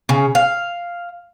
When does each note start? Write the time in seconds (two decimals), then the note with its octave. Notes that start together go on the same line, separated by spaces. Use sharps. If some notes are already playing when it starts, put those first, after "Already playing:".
0.09 C#3
0.35 F5